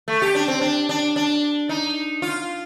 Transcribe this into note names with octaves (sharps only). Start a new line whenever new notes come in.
A3
G4
D4
C4
D4
D4
D4
D#4
F4